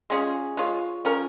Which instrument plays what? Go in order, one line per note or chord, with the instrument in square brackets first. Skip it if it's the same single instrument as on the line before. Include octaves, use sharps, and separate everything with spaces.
[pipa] G#3 C#4 F4 G#4
G#3 F4 C#5
F3 C#4 A#4